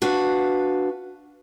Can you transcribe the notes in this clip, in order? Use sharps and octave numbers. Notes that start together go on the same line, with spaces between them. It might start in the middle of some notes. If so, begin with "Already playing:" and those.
D4 F#4 B4 F5